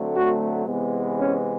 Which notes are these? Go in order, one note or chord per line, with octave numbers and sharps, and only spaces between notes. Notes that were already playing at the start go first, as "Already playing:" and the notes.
Already playing: D3 F#3 A3 C4
F#4
C3 E3 G#3 B3
C#4